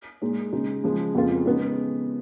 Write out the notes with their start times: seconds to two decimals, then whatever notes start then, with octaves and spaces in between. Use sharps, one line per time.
0.22 A#2 G#3 D#4
0.53 C#3 G#3 D#4
0.84 C#3 F3 G#3
1.15 F2 C#3 G#3 B3 F4
1.46 C#3 G#3 B3 D#4